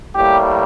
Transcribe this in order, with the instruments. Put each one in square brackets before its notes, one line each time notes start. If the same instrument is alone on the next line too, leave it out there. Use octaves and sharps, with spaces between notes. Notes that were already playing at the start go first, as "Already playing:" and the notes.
[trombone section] A2 G3 A#3 G4